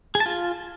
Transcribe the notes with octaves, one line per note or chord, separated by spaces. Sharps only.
G#4
A5
F4